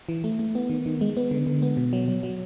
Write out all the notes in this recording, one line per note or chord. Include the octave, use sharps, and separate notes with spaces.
E3
A3
A3
B3
D#3
D#3
G#3
B3
D3
D3
B3
B2
F#3
F#3
F#3